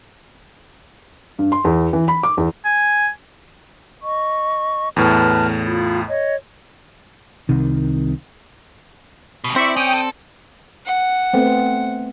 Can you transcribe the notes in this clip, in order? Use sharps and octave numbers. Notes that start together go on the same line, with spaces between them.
G2
C6
E2
E3
B5
D6
E2
G#5
D#5 C#6
E2 A2 B4 A5 F6
F4 B5
C#5 D#5
C2 C3 D#3
D2 B2
C4 E4 D5 E5 C#6
C#4 G5 D#6
A4
F#5
A3 B3 C4